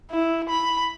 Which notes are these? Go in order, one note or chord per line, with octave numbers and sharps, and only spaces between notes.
E4
B5